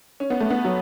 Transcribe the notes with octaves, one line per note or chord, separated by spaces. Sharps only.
C#4
B3
A3
B3
F#3